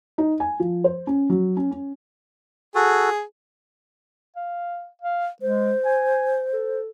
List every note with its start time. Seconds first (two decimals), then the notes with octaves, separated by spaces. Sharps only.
0.18 D#4
0.40 G#5
0.60 F3
0.84 C5
1.07 C#4
1.30 F#3
1.57 C#4
1.71 C#4
2.75 F#4 G#4 A4
4.36 F5
5.02 F5
5.42 G#3 C5
5.85 G#5
6.53 A4